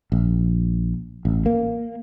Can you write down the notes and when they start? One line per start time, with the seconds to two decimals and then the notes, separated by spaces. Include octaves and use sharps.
0.12 A#1
1.25 A1
1.46 A#3